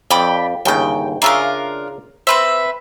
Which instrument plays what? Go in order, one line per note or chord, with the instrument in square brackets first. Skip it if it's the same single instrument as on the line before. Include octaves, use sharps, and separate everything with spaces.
[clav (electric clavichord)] F2 [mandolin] D5 G5 B5
[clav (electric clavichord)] G1 D#2 C#3 [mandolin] G5 G6
[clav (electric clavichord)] C#3 E5 A#5 [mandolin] D4 F4 A#4
[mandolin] C4 B4 E5 [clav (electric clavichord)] C5